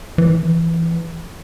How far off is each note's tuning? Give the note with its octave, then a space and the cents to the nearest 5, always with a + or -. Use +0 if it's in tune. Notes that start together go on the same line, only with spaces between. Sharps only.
E3 +15